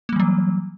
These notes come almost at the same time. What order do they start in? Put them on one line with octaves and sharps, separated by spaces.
A#3 G3 E3 F#3